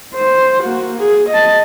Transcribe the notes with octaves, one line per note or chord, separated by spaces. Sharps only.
C5
A#3 F#4
G#4
D#5 A5